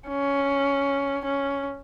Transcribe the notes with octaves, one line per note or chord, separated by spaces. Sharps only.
C#4
C#4